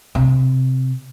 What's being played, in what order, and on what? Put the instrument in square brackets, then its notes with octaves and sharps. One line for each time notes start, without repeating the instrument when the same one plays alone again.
[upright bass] C3